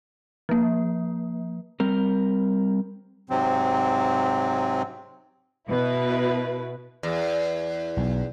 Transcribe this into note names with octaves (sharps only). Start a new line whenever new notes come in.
F3 A#3
G3 C4 A#4
G#2 C3 F#3 C4
B2 E4 B4
E2
B1